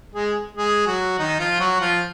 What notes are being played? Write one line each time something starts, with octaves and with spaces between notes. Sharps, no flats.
G#3 G#4
G#3 G#4
F#3 F#4
D#3 D#4
F3 F4
F#3 F#4
F3 F4